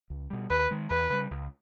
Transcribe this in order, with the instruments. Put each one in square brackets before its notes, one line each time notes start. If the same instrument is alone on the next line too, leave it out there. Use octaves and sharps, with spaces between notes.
[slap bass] C#2
B2 G3
[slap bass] D#2 [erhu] B4
[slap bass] D#3 G#3
[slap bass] E2 [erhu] B4
[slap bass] C#3 G3
C#2